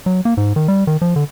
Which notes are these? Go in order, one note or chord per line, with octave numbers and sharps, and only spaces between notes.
F#3
A#3
G#2
D#3
G3
D#3
F3
D3